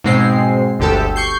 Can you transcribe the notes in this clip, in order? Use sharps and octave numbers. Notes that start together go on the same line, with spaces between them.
G#2 B2 G#3 C4 C7
G1 D2 G4 A4
C#6 G6 C7